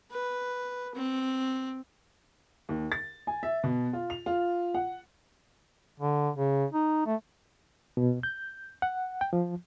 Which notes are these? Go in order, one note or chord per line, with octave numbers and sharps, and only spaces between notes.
B4
C4
D#2
A6
G#5
E5
B2
F4
F7
F4
F#5
D3
C#3
D#4
A3
B2
G6
F#5
G5
F3